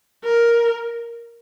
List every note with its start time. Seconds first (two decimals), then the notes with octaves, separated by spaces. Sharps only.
0.24 A#4